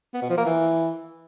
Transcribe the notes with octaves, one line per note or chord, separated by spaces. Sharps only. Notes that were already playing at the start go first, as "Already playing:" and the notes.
B3
B2
F3
A#3
E3